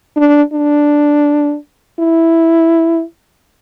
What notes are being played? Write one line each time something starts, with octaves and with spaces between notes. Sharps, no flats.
D4
D4
E4